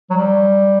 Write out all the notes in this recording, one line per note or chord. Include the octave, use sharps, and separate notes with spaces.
F#3
G3